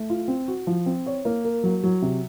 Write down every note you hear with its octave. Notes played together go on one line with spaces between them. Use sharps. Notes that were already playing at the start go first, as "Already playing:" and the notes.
Already playing: A3
F4
C4
F#4
F3
C4
C#5
A#3
A#4
F#3
F#3
C3